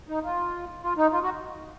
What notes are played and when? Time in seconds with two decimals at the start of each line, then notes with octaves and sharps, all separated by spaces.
0.09 D#4
0.23 F4
0.83 F4
0.97 D#4
1.13 F4
1.23 F#4